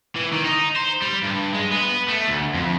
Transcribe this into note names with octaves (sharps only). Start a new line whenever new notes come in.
E3
D#3
D#4
C5
G3
G2
G#3
B3
A3
D2
F2